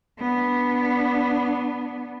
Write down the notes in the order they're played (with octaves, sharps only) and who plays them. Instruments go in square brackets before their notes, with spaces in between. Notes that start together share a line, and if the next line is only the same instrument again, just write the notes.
[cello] B3 D4